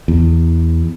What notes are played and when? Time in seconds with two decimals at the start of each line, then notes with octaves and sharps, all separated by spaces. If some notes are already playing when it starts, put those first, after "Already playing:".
0.08 E2